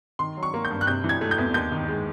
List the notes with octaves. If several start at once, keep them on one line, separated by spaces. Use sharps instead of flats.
D#3 C6
F#3
C#6
A#3
G6
G2
F#6
C3 G6
E3
G#6
A3
G6
E2
D#2 G6
D#3
G#3